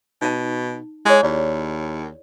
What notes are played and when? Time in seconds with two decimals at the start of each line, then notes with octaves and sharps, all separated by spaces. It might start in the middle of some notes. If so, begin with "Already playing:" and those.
0.21 B2 D#4 A5
1.05 G#3 E4 G#4 C#5
1.23 D#2 D5